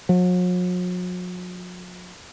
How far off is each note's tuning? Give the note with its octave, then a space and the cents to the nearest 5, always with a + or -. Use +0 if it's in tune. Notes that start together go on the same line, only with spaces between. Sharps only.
F#3 -45